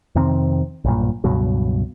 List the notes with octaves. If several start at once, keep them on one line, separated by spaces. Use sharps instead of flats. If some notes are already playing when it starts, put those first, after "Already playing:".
F2 C3 D#3 C4
B1 G2 A#2
C#2 G2 B2 F#3